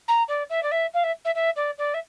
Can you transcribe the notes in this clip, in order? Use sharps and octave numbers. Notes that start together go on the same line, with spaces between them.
A#5
D5
E5
D5
E5
F5
E5
E5
E5
D5
D5
E5